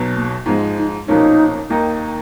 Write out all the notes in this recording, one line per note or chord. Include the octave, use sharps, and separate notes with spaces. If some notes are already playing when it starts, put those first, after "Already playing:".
Already playing: B1 B2 F#3
A#3
G#2 F3 G#3 B3
D#4
B1 A#2 F3 A#3 C#4 D#4
D#2 D#3 A#3 D#4